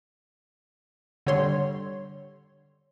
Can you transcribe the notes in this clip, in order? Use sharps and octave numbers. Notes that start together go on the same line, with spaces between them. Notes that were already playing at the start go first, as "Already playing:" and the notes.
D3 G3 C#5 C6